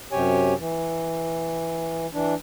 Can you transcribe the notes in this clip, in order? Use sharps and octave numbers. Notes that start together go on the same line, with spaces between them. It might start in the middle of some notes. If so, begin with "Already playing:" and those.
F#2 C3 G4 C#5 G#5
E3
E3 D4